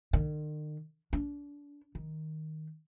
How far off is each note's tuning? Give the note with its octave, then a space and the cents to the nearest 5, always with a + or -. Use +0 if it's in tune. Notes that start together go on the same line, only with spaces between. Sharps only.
D#3 -45
D4 -30
D#3 +5